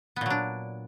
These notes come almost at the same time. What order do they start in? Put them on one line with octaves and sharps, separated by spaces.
B3 A#2 F#3 D4